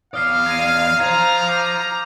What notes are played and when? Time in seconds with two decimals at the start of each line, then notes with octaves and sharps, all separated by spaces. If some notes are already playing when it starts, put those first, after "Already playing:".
0.14 E2 D5 F5 D#6 F6 C7
0.46 G#6 A#6 D#7
1.00 F4 C5 F5 A#5 G#6 F7
1.49 D6 G6